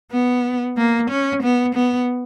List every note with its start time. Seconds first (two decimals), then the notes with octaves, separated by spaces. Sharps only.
0.12 B3
0.77 A#3
1.10 C#4
1.43 B3
1.75 B3